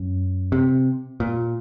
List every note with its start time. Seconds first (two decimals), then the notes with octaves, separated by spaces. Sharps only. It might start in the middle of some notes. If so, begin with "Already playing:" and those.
Already playing: F#2
0.52 C3
1.20 A#2